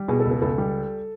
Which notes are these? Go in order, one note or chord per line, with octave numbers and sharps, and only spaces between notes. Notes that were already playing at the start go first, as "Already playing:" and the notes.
Already playing: G3
B2 G#4
A4
C#2
A4
C#2 A4
G3